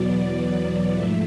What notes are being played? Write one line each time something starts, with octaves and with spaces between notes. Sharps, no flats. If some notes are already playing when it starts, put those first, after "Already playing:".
Already playing: E2 B2 F#3 B3 D5
D5
G#2 F3 A3 E5